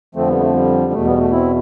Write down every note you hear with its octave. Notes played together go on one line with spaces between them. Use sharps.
F2 D3 F3 A3 C4
G3 B3
A3
G3
E2 B2 A3
G3 B3
A3
C4 E4